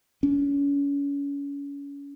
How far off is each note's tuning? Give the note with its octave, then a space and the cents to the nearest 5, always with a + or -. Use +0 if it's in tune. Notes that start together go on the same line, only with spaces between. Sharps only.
C#4 +30